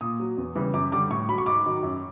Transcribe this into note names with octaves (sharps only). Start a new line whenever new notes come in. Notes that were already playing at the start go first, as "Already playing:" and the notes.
A#2 D#6
F#3
E2
C#3 E3 G3
F#2 D6
D3 G3 D6
A2 C#6
F#3 B5
C#6
G#2 D6
D#3 F#3
F#2